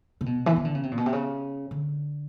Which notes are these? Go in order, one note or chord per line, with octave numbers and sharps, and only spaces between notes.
C3
B2
E3
D#3
D3
C#3
C3
A#2
B2
C3
C#3
D3